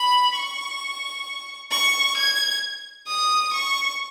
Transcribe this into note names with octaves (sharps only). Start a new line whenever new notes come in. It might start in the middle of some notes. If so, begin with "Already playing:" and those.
Already playing: B5
C#6
C#6
G#6
D#6
C#6